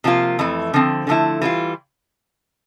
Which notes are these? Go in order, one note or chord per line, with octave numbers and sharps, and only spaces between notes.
C3 F3 A#3 F4
F2 E3 A3
D3 F3 C4
D3 F3 A3 E4
E3 G3 D4 F4